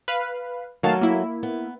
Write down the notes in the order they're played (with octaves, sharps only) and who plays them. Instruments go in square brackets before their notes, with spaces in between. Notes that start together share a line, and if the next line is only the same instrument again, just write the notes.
[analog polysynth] B4 F5
[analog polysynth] D#3 F5 A5 [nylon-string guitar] F#3 A3 F#4
[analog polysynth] A#3 E4
[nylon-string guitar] B3